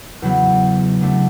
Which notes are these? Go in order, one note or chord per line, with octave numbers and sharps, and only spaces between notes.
E2 C#3 F#3 B3
C#3 F#3 A3 D4